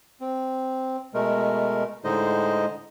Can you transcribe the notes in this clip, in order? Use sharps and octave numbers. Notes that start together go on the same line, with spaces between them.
C4
B2 G#3 A3 A#4
A2 D3 G#3 D#4 C5 D#5